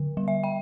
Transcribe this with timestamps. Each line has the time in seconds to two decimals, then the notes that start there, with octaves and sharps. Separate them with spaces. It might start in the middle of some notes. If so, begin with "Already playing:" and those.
Already playing: D3
0.17 G3
0.28 E5
0.44 G5